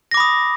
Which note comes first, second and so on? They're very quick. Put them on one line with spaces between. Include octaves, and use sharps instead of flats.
A#6 D6 B5 D#6